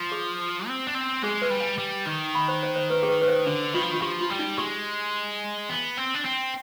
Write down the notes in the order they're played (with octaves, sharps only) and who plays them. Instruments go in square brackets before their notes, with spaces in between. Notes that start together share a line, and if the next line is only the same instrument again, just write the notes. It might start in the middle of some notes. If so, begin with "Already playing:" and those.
Already playing: [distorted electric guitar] F3
[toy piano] G#4
[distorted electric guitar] C4
D4
C4
[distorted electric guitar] G#3 [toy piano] G#4
[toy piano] B4
[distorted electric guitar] G3
[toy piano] G#5
[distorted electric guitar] G3
D#3
[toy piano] B5
C5
C5
C5
B4
G#4
B4
B4
C5
[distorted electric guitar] D3 [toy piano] D4
[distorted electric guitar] D#3 [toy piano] F4
[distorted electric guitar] F3
[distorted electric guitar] D#3 [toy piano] F4
[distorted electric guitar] F3 [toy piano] G4
[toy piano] F4
[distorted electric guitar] G3
[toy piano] D#4
[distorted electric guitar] G#3 [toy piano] G4
[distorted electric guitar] B3
C4
D4
C4